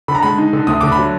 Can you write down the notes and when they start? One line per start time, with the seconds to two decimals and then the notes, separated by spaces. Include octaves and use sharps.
0.08 D3 B5
0.15 A#5
0.22 G#3 B5
0.38 D#4
0.53 D3
0.67 D2 D#6
0.81 D3 D6
0.92 B5
0.98 F#3